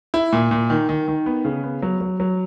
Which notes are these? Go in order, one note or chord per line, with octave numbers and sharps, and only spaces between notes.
E4
A#2
A#2
D#3
D#3
D#3
B3
C#3
B3
F#3
F#3
F#3